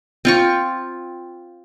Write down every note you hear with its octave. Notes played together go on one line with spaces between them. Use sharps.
C4 F4 C#6